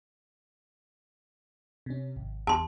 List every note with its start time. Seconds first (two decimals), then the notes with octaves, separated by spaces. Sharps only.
1.86 C3 C#4
2.16 G#1
2.47 E2 A5 C6